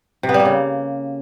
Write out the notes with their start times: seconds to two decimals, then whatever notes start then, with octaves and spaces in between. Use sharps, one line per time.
0.23 C3
0.29 B3
0.34 G3
0.40 A#3
0.45 C#3